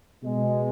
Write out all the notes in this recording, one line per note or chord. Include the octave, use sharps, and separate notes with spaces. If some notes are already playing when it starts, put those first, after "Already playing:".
B2 G#3